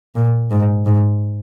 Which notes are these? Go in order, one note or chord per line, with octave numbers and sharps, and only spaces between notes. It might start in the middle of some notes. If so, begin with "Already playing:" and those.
A#2
G#2
G#2